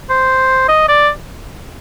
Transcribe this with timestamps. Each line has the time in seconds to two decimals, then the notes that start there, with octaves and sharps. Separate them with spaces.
0.10 C5
0.69 D#5
0.88 D5